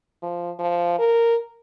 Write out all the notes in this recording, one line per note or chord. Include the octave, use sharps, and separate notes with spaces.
F3
F3
A#4